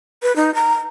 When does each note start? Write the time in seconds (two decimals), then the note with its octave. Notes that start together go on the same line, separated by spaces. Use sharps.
0.23 B4
0.36 D#4
0.55 A#5